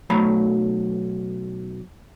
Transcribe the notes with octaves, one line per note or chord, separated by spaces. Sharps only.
B1 F#3 A3 A#5 B5